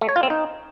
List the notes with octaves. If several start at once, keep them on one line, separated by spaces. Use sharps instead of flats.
A3
C#5
F4
C4
D#4